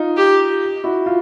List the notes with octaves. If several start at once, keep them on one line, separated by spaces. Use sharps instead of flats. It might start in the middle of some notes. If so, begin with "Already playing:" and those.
Already playing: D#4 F4
G4
E4 F#4
F4